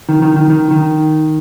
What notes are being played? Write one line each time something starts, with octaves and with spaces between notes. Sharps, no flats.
D#3
D#3
D#3
D#3
D#3